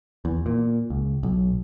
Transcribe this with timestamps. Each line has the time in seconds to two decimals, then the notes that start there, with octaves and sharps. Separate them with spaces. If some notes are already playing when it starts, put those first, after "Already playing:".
0.25 E2
0.46 A#2
0.90 C#2
1.23 B1